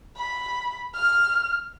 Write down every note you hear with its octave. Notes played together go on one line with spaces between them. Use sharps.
B5
F6